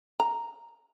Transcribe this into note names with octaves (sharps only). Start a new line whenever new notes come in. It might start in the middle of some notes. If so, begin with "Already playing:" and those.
A#5